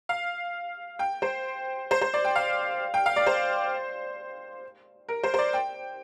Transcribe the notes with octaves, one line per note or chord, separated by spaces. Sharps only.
F5
G5
C5
C5
C5
D5
G5
F5
G5
F5
D5
C5
A#4
C5
C5
D5
G5